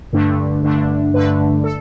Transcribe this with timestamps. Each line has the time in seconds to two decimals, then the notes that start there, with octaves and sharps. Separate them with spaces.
0.13 G2 D3 A3 D4
0.63 G2 D3 A3 D4
1.14 G2 D3 A3 D4 B4
1.64 A4